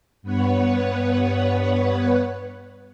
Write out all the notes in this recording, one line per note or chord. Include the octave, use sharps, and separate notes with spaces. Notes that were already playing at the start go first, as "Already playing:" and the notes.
G2 B3 B4 C#5 F#5